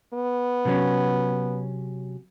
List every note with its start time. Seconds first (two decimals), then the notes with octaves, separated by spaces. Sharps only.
0.14 B3
0.65 C3 F#3 C#4